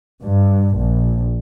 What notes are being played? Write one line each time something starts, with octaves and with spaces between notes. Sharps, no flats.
G2
A#1